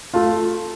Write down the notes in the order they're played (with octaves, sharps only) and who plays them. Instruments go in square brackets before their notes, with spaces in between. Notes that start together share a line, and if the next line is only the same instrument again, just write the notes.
[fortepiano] A3 [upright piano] F4